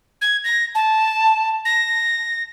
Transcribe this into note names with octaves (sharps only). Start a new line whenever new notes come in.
G#6
A#6
A5
A#6